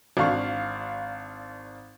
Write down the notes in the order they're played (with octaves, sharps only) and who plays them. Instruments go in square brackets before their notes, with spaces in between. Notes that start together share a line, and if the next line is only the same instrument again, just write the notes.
[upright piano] G#1 D4 F5 C#6